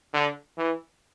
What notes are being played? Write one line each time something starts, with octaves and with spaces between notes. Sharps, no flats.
D3
E3